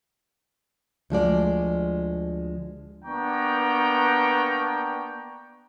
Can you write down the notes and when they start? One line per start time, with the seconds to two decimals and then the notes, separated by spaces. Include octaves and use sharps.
1.10 D2 F3 G#3 D5
3.05 A#3 B3 D4 G5 A#5 C#6